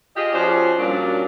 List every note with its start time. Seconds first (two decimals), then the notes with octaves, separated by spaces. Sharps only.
0.16 F4 G4 G#4 D#5
0.33 F3 C#4 F#4 G#4 C5 D5
0.78 G2 A#2 F#3 A#3 C#4 D4